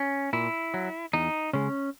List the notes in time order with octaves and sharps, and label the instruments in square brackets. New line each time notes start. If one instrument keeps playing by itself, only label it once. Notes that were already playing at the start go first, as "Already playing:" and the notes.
Already playing: [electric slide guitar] C#4
A#2 E4
F#3
E2 D#4
C#3 G#3 C#4